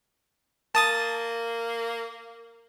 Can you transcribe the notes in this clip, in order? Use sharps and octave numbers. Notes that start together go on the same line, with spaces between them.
A#3 A5 D#6 A6